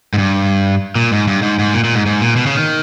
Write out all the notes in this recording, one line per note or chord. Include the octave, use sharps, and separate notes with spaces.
G#2
G2
A#2
G#2
G2
G#2
G#2
A#2
A#2
G#2
G#2
A#2
B2
C#3
D#3